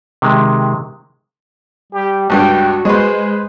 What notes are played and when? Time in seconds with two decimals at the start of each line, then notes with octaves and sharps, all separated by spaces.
0.22 C3 D#3 G#3
1.92 G3 G4
2.30 C#2 G2 G3 F#4 G5
2.85 G#3 G#4 B4 C5